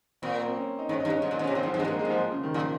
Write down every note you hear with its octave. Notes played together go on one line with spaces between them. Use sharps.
A#2 C4
A#3
C4
C#4
D#4
G#2 C#4
D#4
G2
C#4
G#2 C#4
A#2
G#2
C3 C#4
A#2 C4
G#2
F3
G#2
G2 G#3
G#2 A#3
G#3
G#2
F3
C#3
D#3
A#2 F3